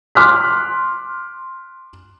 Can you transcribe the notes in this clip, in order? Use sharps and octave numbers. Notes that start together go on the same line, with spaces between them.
C6 D6 F6 F#6 B6